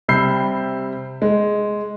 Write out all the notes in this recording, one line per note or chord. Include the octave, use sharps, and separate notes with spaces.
C3 G3 B5 E6 G6 C7
G#3